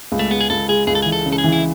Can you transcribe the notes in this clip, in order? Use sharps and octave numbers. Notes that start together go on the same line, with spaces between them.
C#2
A3
G#3 B3
G#4
C#2 A4
G#3 G#4
C#2 G#4
A4
E3 G#4
A4
C#3
A4
G#4
E3
E4